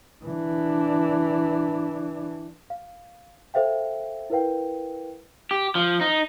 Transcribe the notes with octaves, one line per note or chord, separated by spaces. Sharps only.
E3 D4
F5
A4 C5 E5 F5 G5
E4 A#4 B4 F5 G5
G4
F3
D#4